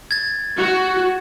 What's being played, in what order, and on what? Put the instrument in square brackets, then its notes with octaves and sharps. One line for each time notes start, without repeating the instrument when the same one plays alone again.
[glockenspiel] G#6 A6
[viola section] F#4